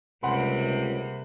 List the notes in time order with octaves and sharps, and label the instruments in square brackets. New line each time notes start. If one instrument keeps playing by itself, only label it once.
[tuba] C#2 [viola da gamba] C3 G3 A#3 [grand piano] F#5 B5 C6